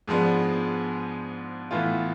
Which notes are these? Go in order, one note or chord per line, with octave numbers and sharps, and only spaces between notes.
G#2 F3 G#3 B3 D4
A2 E3 B3 F4